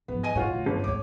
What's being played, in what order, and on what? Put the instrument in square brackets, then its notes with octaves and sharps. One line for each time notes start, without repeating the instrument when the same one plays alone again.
[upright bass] G#2 F3 [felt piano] B3
[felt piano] D#5 G#5 D#7
[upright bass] G#1 A2 [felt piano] F4 F#4 C#5
[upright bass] D2 A#2
[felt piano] G1 [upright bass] G2 F3
[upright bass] G#1 D2 [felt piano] C#5 D6